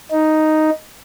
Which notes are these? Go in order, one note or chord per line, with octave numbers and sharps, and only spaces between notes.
D#4